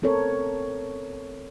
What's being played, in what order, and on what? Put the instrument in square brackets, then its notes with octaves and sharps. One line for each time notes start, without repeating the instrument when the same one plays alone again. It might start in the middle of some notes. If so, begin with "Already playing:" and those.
[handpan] B3 C4 A4 A#4 C#5